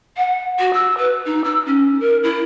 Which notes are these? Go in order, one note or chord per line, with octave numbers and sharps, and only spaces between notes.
F#5
F#4
E6
B4
D#4
E6
C#4
A#4
E4